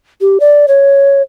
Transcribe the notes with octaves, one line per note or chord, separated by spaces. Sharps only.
G4
D5
C#5